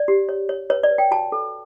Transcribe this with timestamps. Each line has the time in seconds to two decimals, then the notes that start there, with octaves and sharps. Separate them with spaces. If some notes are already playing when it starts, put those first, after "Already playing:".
Already playing: D5
0.08 G4
0.29 C#5
0.49 C#5
0.70 B4 C#5
0.83 D5
0.91 B4
0.98 G5
1.11 F#4 A5
1.32 A4